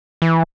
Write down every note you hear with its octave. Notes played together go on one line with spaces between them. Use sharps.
E3